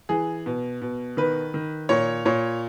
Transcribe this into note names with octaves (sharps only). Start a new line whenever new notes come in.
E3 G#4
B2
B2
D#3 B4
D#3
A#2 C#5
A#2 C#5